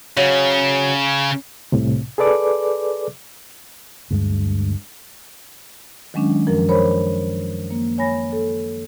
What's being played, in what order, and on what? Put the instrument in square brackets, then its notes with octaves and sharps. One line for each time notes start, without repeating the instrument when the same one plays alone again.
[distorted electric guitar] C#3 [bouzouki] F#3
[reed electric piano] C2 A2 C3
G#4 A4 B4 D5 D6
[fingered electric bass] D2 G2 G#3
[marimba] D#3 F#3 G#3 C#4 D4
F#2 F3 A#4
A#4 C5 C#5 B5
A#3
C#5 G#5 B5 A#6
A4